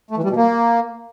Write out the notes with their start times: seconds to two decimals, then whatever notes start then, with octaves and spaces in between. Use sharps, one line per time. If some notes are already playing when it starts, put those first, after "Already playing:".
0.11 A3
0.17 E3
0.23 G3
0.30 B2
0.36 A#3